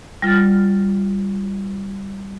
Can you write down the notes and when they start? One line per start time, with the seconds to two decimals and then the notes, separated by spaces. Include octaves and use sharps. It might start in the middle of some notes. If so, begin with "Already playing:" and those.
0.22 G3 F4 F6 A6